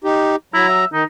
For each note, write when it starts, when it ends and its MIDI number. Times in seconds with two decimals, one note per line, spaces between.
0.04 0.36 63
0.04 0.36 67
0.54 0.85 54
0.54 0.66 64
0.54 0.85 82
0.69 0.85 76
0.93 1.04 51
0.93 1.03 63